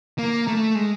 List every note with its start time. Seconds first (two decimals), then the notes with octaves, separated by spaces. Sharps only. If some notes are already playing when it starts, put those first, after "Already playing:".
0.18 A#3
0.48 A3
0.75 G#3